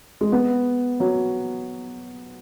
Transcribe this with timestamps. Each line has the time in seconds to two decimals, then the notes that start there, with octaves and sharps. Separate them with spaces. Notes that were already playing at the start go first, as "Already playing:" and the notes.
0.21 G#3
0.32 B3
1.00 F#3